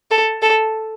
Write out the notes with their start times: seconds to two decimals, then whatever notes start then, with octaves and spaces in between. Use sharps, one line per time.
0.11 A4
0.42 A4